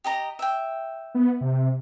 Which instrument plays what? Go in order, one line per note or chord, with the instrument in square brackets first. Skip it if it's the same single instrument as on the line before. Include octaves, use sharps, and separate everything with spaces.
[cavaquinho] G4 D#5 A#5
E5 G5
[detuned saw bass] B3
C3